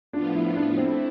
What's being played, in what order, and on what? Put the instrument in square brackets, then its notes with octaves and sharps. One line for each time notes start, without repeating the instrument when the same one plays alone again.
[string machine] A2 F3 B3 F4 [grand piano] D4
[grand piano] E4
D4
[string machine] A3 E4 [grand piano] C4